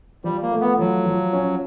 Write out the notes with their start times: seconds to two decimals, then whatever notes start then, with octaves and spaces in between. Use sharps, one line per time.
0.24 F3 G3
0.43 A#3
0.51 A3
0.61 B3
0.79 F3 F#3
1.06 F3
1.33 C#4